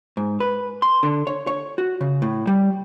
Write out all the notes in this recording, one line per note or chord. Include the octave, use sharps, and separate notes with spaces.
G#2
B4
C6
D3
C#5
C#5
F#4
C#3
A2
G3